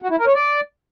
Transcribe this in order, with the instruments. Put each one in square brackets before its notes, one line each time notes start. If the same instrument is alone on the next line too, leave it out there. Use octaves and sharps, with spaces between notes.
[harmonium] F#4
E4
A#4
C#5
D5